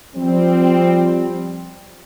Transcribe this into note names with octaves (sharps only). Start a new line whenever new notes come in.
F3 G3 C4